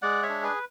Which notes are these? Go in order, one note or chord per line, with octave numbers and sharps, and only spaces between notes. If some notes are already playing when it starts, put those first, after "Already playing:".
G#3 D5 F#5
C#5 E5
D4
G#4 B4